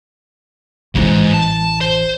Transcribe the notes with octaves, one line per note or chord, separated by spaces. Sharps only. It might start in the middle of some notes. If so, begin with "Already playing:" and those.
A1 D2 G#2 E3
A5
C5